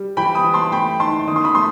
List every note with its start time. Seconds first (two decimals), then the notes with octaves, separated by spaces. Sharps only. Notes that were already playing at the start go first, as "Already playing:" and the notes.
Already playing: G3
0.17 E3 G5 B5
0.35 B5 D#6
0.44 E3
0.54 A5 C6
0.72 A3 G5 B5
1.00 D#4 A5 C6
1.27 D#3 D#6
1.36 C6
1.45 B5 D#6
1.55 A3 A5 C6